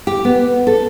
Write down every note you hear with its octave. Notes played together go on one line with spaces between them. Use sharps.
G4
B3
A4